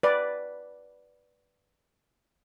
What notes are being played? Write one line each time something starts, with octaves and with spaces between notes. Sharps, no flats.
B4 D5